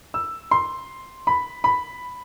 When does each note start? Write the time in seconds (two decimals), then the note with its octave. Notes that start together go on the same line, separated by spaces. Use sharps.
0.14 E6
0.51 C6
1.27 B5
1.64 B5